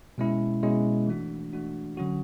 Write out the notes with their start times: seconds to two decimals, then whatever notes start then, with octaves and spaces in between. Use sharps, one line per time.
0.18 B2 G#3 C#4 E4
0.63 B2 G#3 C#4 E4
1.07 E3 A3 D4 F#4
1.53 E3 A3 D4 F#4
1.97 D3 F#3 C#4 F#4